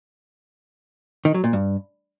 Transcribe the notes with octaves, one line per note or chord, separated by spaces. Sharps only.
D#3
F#3
A#2
G2